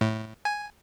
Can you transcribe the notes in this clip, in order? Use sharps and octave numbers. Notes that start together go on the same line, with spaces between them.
A2
G#5